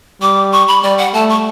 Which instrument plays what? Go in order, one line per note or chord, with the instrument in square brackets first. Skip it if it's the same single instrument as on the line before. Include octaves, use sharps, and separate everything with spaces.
[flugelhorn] G3 [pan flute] D6
[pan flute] C#6
B5
[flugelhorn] G3 [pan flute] D5
[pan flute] F#5
[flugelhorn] A3 [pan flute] A5
[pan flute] C#6